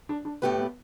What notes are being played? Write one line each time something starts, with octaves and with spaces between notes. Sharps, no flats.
D4
D4
A2 A3 B3 G4 B4
B3